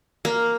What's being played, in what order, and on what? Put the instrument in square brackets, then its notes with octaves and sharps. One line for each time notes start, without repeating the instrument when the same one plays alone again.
[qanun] A#3